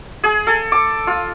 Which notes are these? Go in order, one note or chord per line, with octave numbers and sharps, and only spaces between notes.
G#4
A4
D6
F4